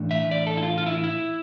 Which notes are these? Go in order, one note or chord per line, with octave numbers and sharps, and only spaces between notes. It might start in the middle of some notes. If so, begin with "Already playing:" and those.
Already playing: A2 E3 A3 D4
E5
D5
A4
E4
F4
F4
E4
E4